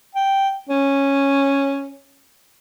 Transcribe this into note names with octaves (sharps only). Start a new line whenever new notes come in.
G5
C#4